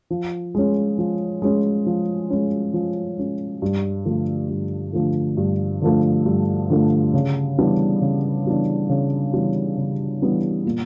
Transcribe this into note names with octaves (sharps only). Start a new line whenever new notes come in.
F3
G#3 C#4
F3
G#3 C#4
F3
G#3 C#4
F3
G#3 C#4
G2
D3 F3 A3
G2
D3 F3 A3
G2
D3 F3 A3
G2
D3 F3 A3
C#3
E3 G3 B3 D4
C#3
E3 G3 B3 D4
C#3
E3 G3 B3 D4
C#3
E3 G3 B3 D4
A#2